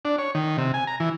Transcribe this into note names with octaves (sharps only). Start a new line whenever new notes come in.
D4
C#5
D#3
C3
G#5
A#5
E3